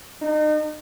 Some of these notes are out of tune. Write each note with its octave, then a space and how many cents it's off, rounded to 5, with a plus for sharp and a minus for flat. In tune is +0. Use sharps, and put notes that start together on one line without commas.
D#4 -35